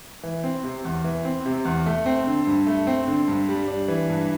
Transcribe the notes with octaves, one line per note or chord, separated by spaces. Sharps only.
E3
C4
C3
E2
E3
C4
C3
E2
A3
C4
D3
G2
A3
C4
D3
G2
G3
D4
E3
G2